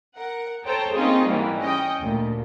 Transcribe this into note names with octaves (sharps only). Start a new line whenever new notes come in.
A#4 F#5
A4 C5 C#5 G5 A5 A#5
A#3 C4 C#4 D#4 F4 G#4
G#2 E3 G3 A#3
C#4 D#5 G5
D2 A#2